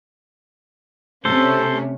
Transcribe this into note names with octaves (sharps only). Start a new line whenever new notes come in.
C3 A3 C#4 A4 C5